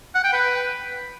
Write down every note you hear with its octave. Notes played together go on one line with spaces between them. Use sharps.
F#5
G5
B4